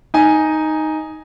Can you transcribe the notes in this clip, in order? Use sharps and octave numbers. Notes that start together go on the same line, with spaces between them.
D#4 G#5